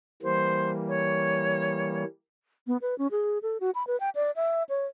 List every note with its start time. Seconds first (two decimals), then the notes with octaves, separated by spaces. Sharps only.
0.22 E3 G3 A#3 C5
0.87 C#5
2.67 B3
2.82 B4
2.98 C#4
3.11 G#4
3.43 A4
3.60 F#4
3.75 B5
3.87 B4
4.00 G5
4.15 D5
4.36 E5
4.69 C#5